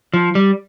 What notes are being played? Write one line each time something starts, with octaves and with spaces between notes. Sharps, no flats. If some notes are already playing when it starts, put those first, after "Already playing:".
F3
G3